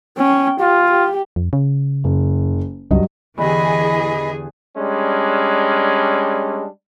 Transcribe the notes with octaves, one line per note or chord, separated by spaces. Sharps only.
C#4 G5
F4 G4
G4
F2
C#3
F#1
C#2 G2 F#3 D#5
E2 D3 E3 G4 G#4 D#5 B5
G3 G#3 C#4 D4